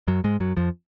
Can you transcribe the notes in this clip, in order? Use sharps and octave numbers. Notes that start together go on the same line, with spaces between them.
F#2 F#3
G#2 G#3
F#2 F#3
F2 F3